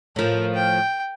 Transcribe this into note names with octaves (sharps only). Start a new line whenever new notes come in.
A2 F3 A#4
G5